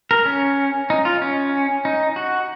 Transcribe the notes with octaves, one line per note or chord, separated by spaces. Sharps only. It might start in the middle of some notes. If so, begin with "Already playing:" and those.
A#4
C#4
D#4
F4
C#4
D#4
F#4